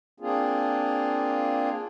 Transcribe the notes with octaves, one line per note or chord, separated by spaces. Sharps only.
A#3 C4 D4 F4 G#4